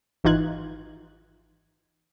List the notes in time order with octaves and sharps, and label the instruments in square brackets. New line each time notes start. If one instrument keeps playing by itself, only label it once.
[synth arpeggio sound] G#1 E3 D#4 F4 F#6 G#6